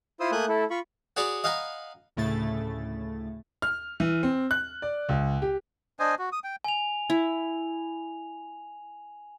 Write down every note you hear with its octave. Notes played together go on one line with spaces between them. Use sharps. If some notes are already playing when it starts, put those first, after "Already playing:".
E4 F4 C5 C6 D#6 E6
A3 A#3 G#5 D#6 F#6 G6
A3 E4 A4
F4 B5 C#6
F#4 G#4 C#5 D5 B5 C#6
D#5 F5 F#5 G#5 A#5 B5
D2 A2 C#3 A3 E4 A6
F6
E3
C4
F#6
D5
C#2
G4
D4 C5 D#5 G#5
F#4
D#6
G5
G#5 F7
E4